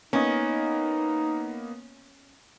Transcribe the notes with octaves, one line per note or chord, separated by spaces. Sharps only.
A#3 B3 C#4 D#4 D#5